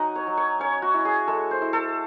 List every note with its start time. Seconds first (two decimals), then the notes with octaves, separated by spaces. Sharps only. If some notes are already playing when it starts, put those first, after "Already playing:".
Already playing: F#3 D#4 D#5 F#5 G#5
0.16 C#5
0.27 F#3
0.37 C#5
0.60 C#4 C#5
0.82 F#4
0.94 E4
1.05 G#4
1.27 G#3 A4
1.51 C5
1.62 E4
1.73 A4